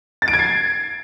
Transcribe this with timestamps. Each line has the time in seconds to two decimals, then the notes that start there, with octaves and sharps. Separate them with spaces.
0.22 A6
0.28 D7
0.33 G#6
0.39 C7